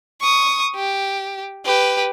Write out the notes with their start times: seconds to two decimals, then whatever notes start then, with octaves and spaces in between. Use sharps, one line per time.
0.21 C#6 D#6
0.75 G4
1.65 G4 B4